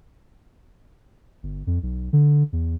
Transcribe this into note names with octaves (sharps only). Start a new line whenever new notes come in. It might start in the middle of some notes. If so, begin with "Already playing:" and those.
G1
F2
B1
D3
E2